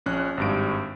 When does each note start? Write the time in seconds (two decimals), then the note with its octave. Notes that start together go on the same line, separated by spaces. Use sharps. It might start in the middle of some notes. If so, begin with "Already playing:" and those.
0.06 A#1 C#4 F#6
0.37 G#1 G2 D7